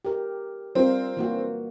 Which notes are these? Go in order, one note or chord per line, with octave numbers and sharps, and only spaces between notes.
G4 A#4
G3 C4 F4 A#4
E3 A#3 F#4